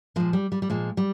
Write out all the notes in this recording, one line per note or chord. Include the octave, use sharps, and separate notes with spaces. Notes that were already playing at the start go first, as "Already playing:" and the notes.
A#2 F3 G#3
G3
G3
G3
A#2 F3 G#3
G3